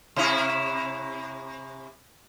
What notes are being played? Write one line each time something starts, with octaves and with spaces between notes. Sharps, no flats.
C3 C#4 E4